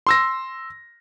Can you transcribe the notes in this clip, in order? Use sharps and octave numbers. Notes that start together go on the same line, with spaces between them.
C6 E6 A#6